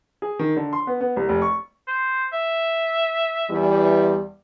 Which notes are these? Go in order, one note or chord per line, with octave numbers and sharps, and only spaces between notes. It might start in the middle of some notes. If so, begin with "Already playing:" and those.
G#4
D#3
D3
C6
B3
B3
C2
F1
C#6
C5
E5
E2 E3 G3